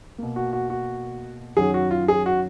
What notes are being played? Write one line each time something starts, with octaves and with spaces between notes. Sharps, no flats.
B2 A#3
F#4
F#4
F#4
F#2 D#3 F#3 G#4
F#4
F4
G#4
F#4